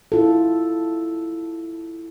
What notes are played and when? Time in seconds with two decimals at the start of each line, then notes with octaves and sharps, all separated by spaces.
0.12 E4 F4 A4